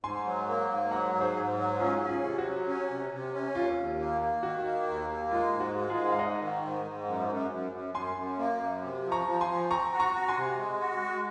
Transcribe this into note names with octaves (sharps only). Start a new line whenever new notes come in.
G#2 G#5 C6
F#3
A#3
G#2
F#3 F#5 A#5
G#2
G#4 C5
G#2
F#3
C#4 F4 G#4
C#4
F4 G#4
C3 F4
F#4
F#3
C#4
C3
C3
C#4
D#2 F4
D#2
A#3
A#3
D#3 F#4
A#3
D#2
A#3
G#3 F4
G#2
F#4
G#3
F4 G#4
G#2
F5
G#2 D#5 F#5
D#3
G#2
G#2
F#2
F#2
F#2
F#2
F#2 G#5 C6
F#2
A#3
F#2
C3
F3
A#5 C#6
F3
G#5 C6
F3
C4 A#5 C#6
F#4
A#5 C#6
F#4
G#5 C6
C3
G#3
F#4
G#3